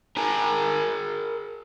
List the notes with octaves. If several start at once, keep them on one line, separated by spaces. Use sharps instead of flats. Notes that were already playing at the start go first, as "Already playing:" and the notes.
G#4 A#4